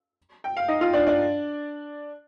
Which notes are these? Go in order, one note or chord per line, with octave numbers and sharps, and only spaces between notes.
G5
F5
D#4 D#5
F4 F5
D4 D5
D4 D5